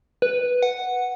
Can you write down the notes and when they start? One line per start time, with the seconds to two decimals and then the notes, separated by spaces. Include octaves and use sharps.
0.22 B4
0.63 F#5